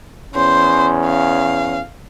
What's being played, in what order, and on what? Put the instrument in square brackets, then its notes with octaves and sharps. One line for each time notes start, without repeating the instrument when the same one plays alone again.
[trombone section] E2 C#4 [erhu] C5
[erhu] F5